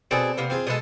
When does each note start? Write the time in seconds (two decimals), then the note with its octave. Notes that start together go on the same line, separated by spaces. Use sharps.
0.11 B2 C4 G#4 A4 D5
0.37 C3 A#3 B3
0.50 C4 F4 G#4
0.67 B2 G#3 A4 C6 D#6